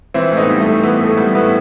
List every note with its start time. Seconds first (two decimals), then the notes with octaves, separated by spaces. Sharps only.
0.14 E3 C4 E4
0.32 A2
0.37 B3 D#4
0.49 G3
0.60 A3
0.66 A2
0.83 E3 B3
1.00 A2 A3
1.17 G3 B3
1.35 A2 B3